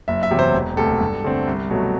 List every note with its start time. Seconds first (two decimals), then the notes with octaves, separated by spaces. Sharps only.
0.08 F#1 E5
0.23 E5
0.31 E2 C3 F#3
0.39 C5
0.54 E1
0.77 D2 C3 A4
1.01 G2
1.24 D3 A3 C4
1.47 C2
1.70 B2 F#3 A3